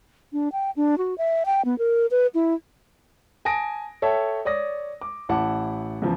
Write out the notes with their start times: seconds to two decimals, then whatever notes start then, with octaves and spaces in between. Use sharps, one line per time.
0.33 D4
0.52 G5
0.76 D4
0.98 F#4
1.18 E5
1.46 G5
1.65 B3
1.78 A#4
2.11 B4
2.34 E4
3.45 G#5 A5 D#6 A#6 D7
4.02 A4 C#5 E5 G5 A5
4.45 C#5 D5 D#6 A#6
5.01 D6
5.29 A1 E4 F#5 A5 D6
6.02 E2 C#3 F3